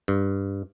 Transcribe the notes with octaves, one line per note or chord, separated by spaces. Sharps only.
G2